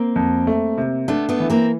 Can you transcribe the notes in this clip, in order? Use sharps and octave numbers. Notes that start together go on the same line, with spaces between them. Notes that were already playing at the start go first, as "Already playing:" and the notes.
Already playing: A#3 C4
F2
A3
C3
A3 B3 D4
A3 B3
E3
A#3 C4